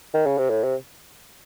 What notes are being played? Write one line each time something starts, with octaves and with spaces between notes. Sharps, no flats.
D#3
C#3
C3
A2
C3